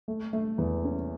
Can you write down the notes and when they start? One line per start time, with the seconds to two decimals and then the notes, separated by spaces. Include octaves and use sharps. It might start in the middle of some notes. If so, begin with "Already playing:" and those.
0.08 A3
0.33 A3
0.58 E2
0.84 C#4